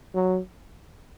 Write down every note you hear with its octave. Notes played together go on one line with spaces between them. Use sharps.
F#3